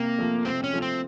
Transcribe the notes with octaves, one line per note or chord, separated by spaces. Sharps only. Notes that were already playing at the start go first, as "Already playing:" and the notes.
Already playing: C3 A#3
F3 A3
C3 C4
C#4
F3 A3
C4